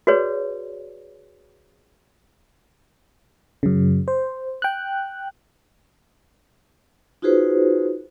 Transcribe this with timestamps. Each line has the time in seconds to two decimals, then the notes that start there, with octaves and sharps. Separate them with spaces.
0.07 F#4 G#4 B4 C#5 D5
3.63 F#2 C#3
4.08 C5
4.62 G5 F#6
7.22 D#4 F4 F#4 G#4 B4 C5